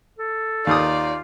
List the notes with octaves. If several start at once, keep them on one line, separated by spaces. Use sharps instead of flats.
A4
D#2 D#4 F4 D5 F5 D#6